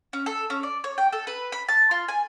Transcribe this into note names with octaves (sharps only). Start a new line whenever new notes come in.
C#4
A4
C#4
D5
C#5
G5
A4
B4
B5
A5
F4
G#5